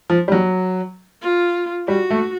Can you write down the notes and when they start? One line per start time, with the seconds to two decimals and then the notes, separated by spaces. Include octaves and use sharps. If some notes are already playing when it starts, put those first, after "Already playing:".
0.10 F3
0.28 G3
0.32 F#3
1.22 F4
1.88 G3 F#4
2.10 A3